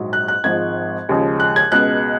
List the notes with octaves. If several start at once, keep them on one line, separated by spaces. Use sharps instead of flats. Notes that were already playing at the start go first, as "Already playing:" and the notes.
Already playing: A#1 G#2 F#3
F#6
F#6
G#1 G#2 F3 G#3 G#6
D#2 C#3 F3 G#3
F#6
G#6
C#2 B2 G#3 F#6